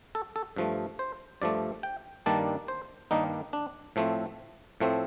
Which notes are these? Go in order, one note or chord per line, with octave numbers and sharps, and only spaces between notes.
A4
A4
G2 F3 A3
C5
G2 F3 A3 D5
G5
G2 D#3 G3 A#3 D4 A5
C5
G2 D#3 G3 A#3 D4 D#4
D4
A2 F3 A3 C4
A2 F3 A3 C4